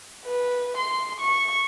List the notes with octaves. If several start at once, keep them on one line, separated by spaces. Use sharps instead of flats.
B4
C6
C#6